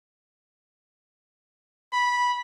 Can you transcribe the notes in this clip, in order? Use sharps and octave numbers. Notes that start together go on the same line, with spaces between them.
B5